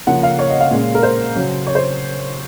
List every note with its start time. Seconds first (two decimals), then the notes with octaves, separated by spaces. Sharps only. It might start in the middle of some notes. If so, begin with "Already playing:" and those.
0.07 C#3 F3 A#3 F#5
0.23 F5
0.39 C#5
0.50 D#5
0.60 F5
0.71 A#2 G#3 C#4
0.95 A#4
1.03 C5
1.35 C#3 F#3 C#4
1.67 C#5
1.75 C5